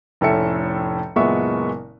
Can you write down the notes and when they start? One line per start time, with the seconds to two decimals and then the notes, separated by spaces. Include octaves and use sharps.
0.21 F1 A2 C#4 A4 E5 C#7
1.16 F#1 A#2 G#3 B3 E5 C#6